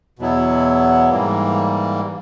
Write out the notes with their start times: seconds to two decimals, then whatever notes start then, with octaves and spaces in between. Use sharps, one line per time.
0.19 E2 B2 F#3 B3 E4
1.09 G#2 E3 G3 A#3